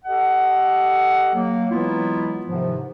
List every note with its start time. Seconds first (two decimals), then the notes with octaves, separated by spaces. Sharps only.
0.05 G4 A4 D#5 F#5
1.34 F#3 A#3
1.71 E3 F#3 G#3 B3 E4 F4
2.46 G#2 C3 D#3 F3